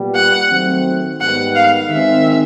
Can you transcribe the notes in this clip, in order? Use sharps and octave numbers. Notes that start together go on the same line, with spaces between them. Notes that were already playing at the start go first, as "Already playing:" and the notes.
Already playing: A#2 G3 B3
F#5
D#3 F#3 A3 C4
G#2 D#3 G3 B3 F#5
F5
D#3 G#3 C4 E5